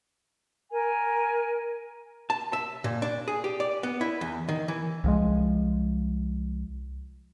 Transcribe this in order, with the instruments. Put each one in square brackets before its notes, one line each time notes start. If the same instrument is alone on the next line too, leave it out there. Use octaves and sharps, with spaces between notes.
[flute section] A#4 G#5
[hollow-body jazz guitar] A5
E5
A#2
D4
G#4
G4
D5
B3
E4
E2
D#3
E3
[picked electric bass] C2 F3 G#3